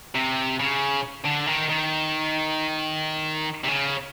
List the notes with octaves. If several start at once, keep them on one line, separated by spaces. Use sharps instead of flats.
C3
C#3
D3
D#3
D#3
C3
C#3